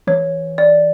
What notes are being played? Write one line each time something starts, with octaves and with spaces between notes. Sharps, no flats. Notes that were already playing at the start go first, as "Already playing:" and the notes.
E3 C#5
D5